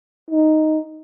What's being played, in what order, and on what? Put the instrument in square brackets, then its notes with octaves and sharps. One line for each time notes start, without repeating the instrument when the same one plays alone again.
[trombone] D#4